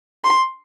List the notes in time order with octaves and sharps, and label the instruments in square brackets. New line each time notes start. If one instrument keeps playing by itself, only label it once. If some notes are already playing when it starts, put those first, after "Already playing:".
[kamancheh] C6